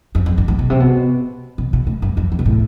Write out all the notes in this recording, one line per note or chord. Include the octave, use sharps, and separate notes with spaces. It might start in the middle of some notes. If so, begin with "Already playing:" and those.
F2
F2
G2
A2
B2
C3
B2
B2
B2
A2
G2
F2
F2
B2
A2